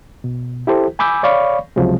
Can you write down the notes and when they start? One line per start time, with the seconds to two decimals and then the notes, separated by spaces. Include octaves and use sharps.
0.24 B2
0.67 E4 G4 A4 C5
0.99 G#5 B5 D6 E6 G6
1.23 C#5 D5 F5 B5 C#6
1.76 C#2 C3 F3 F#3 G#3